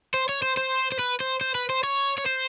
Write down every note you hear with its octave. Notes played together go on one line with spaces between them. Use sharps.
C5
C#5
C5
C5
C5
B4
C5
C5
B4
C5
C#5
C#5
C5